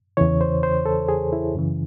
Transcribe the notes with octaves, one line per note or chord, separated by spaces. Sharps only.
E2 C#3 E3 C#5
C5
C5
A4
G#4
E4
F#2 C#3 E3